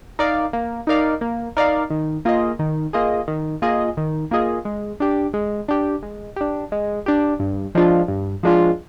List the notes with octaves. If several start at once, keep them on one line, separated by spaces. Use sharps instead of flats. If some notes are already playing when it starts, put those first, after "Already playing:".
D#4 A#4 D5 F5
A#3
D#4 A#4 D5 F5
A#3
D#4 A#4 D5 F5
D#3
A#3 F4 G#4 D#5
D#3
A#3 F4 G#4 D#5
D#3
A#3 F4 G#4 D#5
D#3
A#3 F4 G#4 D#5
G#3
D4 G4
G#3
D4 G4
G#3
D4 G4
G#3
D4 G4
G2
F3 G#3 D4 F4
G2
F3 G#3 D4 F4